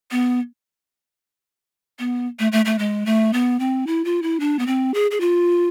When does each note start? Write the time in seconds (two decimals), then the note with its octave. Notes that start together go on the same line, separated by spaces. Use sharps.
0.11 B3
1.99 B3
2.39 A3
2.52 A3
2.65 A3
2.79 G#3
3.06 A3
3.33 B3
3.59 C4
3.87 E4
4.05 F4
4.22 E4
4.40 D4
4.59 B3
4.67 C4
4.94 G#4
5.11 G#4
5.20 F4